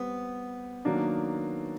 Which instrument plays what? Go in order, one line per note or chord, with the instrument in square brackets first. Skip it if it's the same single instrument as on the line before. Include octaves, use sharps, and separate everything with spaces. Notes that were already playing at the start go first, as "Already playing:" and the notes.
Already playing: [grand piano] G3 C4 [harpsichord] B3
[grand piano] D#3 F#3 A#3 D4